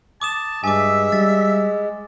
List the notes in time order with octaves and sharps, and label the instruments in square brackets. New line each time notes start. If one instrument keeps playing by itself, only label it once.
[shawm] A5 [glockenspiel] D6 D#6 E7
[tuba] G2 [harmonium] G#3 [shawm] E5 [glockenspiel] G#5 D6
[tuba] G3 [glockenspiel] A6